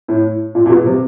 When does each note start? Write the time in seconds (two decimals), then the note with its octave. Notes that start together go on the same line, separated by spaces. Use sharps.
0.08 A2
0.55 A#2
0.66 A#2
0.70 B2
0.86 C3